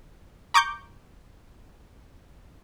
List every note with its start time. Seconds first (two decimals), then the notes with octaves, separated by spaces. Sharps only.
0.54 A#5 C#6 D6 G6